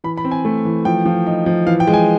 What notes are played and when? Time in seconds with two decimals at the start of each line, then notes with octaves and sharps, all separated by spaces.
0.04 E3 B5
0.17 B5
0.25 C4
0.31 G#5
0.45 A3
0.65 E3
0.85 F3 G5
1.05 F3
1.27 D#4
1.46 F3
1.66 E3 F5
1.80 G5
1.87 G#3
1.93 G#5